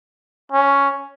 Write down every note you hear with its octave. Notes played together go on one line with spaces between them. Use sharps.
C#4